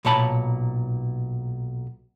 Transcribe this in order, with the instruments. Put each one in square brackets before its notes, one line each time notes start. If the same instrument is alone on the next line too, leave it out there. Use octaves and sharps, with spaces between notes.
[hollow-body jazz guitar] B1 A#2 C#5 A5 B5